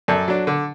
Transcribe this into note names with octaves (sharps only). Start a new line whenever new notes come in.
F#2 A4 D5
F#3 D4
D3